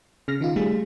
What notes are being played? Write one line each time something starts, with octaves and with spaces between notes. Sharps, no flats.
C#3 F6 A#6
D#3 D#4 F4
G3 A3 G#4